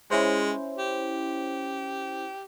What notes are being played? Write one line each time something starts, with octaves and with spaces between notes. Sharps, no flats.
G#3 C#4 E4 C5
G4